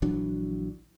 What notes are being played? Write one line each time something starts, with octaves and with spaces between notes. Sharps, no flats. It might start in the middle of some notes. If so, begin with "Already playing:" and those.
A#1 E3 F#3 D4